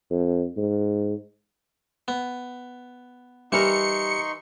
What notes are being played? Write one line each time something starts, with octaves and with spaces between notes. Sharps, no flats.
F2
G#2
B3
E3 G3 D#4 A#4 C6 C#6 C#7